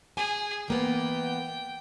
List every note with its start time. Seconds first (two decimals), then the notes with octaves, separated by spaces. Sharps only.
0.17 G#4 G#5
0.68 E3 A#3 B3 G5